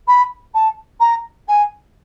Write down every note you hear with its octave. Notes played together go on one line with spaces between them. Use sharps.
B5
A5
A#5
G#5